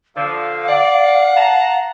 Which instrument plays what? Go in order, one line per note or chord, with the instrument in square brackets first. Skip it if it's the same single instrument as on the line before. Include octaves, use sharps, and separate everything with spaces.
[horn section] D3 F3 [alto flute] F5
[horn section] D5 [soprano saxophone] F#5
[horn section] A5 A#5